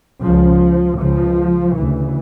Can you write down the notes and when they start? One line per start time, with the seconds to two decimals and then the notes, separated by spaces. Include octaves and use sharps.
0.23 C#2 C#3 F3
1.01 C#2 C#3 F3
1.78 D2 C#3 E3